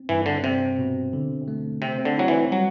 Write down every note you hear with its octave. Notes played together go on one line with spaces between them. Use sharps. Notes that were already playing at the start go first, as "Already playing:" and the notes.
Already playing: C4
G2 E3
D3
C3 C4
B2
D3
A3
C3 C4
D3
F#3 E4
E3
F#3 G3